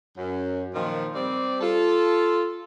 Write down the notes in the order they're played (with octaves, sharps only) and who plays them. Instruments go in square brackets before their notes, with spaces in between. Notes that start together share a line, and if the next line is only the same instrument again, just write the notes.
[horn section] F#2
A#2 D#3 F3
G3 C4 D5
F4 A4